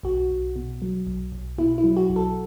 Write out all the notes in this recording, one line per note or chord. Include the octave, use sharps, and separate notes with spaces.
B1 F#4
B1
B2
F#3
B1
B1
B2 E4
E4
F#3
F#4
B1
A4